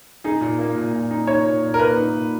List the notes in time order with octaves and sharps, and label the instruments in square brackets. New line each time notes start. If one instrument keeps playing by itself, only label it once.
[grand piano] D#4 [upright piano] G#4
[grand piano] A#2
A#3
A#2
A#2
D#4
[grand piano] D#4 [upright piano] C#5
[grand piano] A#2
A#2
[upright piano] A#4
[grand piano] A#3 [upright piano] B4
[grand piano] D#4
A#2